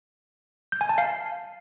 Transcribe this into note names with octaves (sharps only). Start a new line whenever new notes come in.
G6
G#5
A5
F5